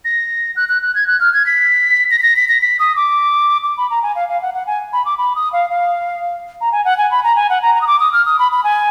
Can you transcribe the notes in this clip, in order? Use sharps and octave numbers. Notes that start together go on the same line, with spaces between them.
A#6
F#6
F#6
F#6
G#6
F#6
F6
G#6
B6
A#6
B6
A#6
B6
A#6
B6
D#6
D6
D6
B5
A#5
G#5
F5
F5
F#5
F#5
G#5
B5
D6
B5
D#6
F5
F5
A#5
G#5
F#5
G#5
B5
A#5
G#5
F#5
A#5
A#5
D#6
D6
D#6
F6
D#6
B5
B5
G#5